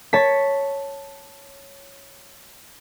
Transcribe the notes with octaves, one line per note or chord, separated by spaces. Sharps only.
C#5 A5 B6